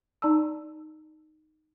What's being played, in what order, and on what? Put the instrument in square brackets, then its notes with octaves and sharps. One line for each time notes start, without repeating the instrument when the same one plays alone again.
[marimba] D#4 D5 A5 A#5 E6